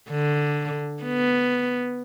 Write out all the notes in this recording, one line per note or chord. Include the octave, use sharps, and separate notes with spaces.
D3
B3